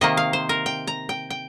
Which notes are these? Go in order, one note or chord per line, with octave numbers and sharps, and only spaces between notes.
C3 D#3 A#3 D#5
F5
C5
A#4
G5
A#5
G5
G5